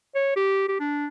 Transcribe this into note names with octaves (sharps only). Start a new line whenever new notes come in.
C#5
G4
G4
D4